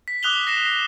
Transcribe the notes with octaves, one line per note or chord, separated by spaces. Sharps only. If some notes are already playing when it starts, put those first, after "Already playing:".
B6
D6 D#6 F#6 F7 G7
A#6 C7 E7